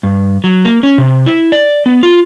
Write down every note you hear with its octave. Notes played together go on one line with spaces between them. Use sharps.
G2
F#3
A#3
C#4
C3
E4
D5
B3
F4